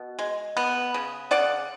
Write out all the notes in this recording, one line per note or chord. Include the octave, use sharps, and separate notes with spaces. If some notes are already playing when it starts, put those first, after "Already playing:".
Already playing: B2
G#3
B3
C#3
C#3 D5 F#5